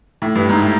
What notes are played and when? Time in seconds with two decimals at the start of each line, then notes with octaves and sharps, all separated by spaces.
0.22 A2
0.35 G2
0.49 G#2
0.62 A2